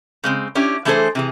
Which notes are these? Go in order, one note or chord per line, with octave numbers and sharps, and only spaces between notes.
C#3 G#3 C4
C#4 D4 E4 G4
E3 A3 D4 G#4 A4 C5
C3 E3 G#4